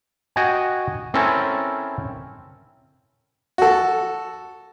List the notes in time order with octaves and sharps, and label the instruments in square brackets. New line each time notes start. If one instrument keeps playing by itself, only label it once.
[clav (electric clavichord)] F#4 D#5 G5 G#5
C4 C#4 E4 A4 A#4
[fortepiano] F#4 A4